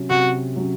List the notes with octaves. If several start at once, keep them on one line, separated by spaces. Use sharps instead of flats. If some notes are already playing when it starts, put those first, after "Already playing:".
Already playing: C3 F#3 C#4
C3 F#4
F#3 C#4